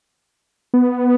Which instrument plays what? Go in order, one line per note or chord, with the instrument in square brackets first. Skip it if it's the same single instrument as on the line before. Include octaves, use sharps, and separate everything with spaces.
[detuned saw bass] B3